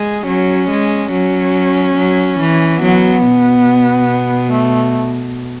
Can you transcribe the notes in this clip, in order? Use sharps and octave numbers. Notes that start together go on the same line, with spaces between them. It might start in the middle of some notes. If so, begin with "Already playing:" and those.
Already playing: G#3 G#4
F#3 C#4
G#3
F#3 C#4
F#3
E3
F#3 B3
B2
A3